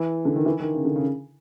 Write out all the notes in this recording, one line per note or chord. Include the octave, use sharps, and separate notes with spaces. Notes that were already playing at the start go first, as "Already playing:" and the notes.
Already playing: E3
D3
D#3
E3
D#3
C#3
D3
C#3